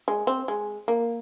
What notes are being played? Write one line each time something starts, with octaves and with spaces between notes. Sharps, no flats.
G#3
C4
G#3
A#3